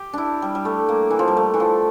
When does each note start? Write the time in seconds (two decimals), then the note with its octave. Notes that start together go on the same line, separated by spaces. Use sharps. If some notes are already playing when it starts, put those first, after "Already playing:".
Already playing: G4
0.13 D4 E4
0.42 G3
0.55 G3
0.65 A3
0.89 A#3
1.11 E3
1.19 F3
1.28 G3
1.37 A3
1.54 E3
1.60 F3